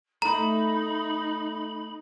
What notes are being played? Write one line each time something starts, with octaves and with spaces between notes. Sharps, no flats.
A3 D#4 A4 A#5 B5